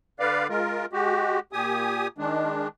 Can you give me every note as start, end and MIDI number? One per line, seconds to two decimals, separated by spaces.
0.20 0.47 50
0.20 0.47 71
0.20 0.47 74
0.20 0.47 77
0.49 0.86 56
0.49 0.86 65
0.49 0.86 70
0.93 1.39 56
0.93 1.39 66
0.93 1.39 67
1.53 2.08 46
1.53 2.08 67
1.53 2.08 80
1.53 2.08 87
2.18 2.68 51
2.18 2.68 56
2.18 2.68 62